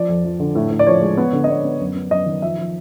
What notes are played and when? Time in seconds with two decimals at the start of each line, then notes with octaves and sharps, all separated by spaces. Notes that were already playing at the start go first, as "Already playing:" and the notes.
Already playing: F3 D5
0.09 F2
0.24 F3
0.40 D3
0.55 A2
0.71 A2
0.79 D5
0.87 F3 C#5
1.02 G#3
1.17 B3
1.33 D3
1.44 D#5
1.49 B3 D5
1.64 B3
1.80 F#2
1.96 B3
2.11 F#2 D#5
2.26 D#3
2.42 F3 E5
2.58 F3